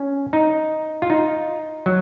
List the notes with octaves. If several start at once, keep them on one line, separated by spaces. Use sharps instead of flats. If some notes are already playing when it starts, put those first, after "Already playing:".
Already playing: C#4
D#4
F4
D#4
F#3